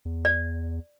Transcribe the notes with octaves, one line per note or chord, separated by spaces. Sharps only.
E2
D5